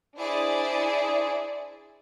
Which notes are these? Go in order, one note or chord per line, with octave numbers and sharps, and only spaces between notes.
D4 E4 G#4 C5 D5